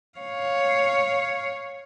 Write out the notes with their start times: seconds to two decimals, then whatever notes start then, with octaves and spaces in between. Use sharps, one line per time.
0.19 C#5 F5